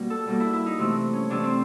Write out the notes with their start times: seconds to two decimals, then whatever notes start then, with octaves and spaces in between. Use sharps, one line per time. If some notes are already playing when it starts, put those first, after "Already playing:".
Already playing: B2 G3 A#3
0.10 A4
0.27 B2 G3 A#3
0.40 E4
0.53 E4
0.66 D#4
0.79 C3 E3 A3
1.13 C#4
1.30 C3 E3 A3 D4
1.44 C4